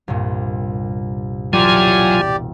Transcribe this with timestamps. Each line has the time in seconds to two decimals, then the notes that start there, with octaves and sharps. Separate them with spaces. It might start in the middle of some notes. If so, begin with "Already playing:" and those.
0.08 C2 G2 A#2
1.53 E1 F#3 F4 G4 D5 G#5